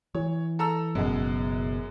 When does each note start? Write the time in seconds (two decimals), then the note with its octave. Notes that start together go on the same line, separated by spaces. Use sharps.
0.15 E3 C#5
0.59 A4 A#5 E6
0.95 F#1 F#2 B2 G#3